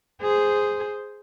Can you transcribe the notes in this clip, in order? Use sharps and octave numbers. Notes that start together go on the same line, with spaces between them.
G#4 C5